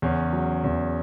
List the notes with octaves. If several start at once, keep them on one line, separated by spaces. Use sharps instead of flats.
E2 C#3 C#4
F#3
E2